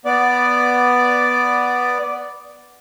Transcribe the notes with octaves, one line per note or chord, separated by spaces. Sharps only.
B3 D5